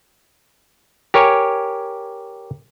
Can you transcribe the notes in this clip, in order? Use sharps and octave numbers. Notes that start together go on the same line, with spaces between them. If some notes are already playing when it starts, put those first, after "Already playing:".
G4 A#4 C#5 G#5